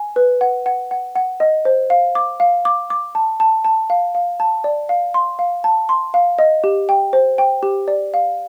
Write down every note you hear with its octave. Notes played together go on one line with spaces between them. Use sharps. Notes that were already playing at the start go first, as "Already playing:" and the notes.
Already playing: G#5
B4
F#5
F#5
F#5
F#5
D#5
C5
F5
D6
F5
D6
D6
A5
A5
A5
F5
F5
A5
D5
F5
C6
F5
A5
C6
F5
D#5
G4
G5
C5
G5
G4
D5
F5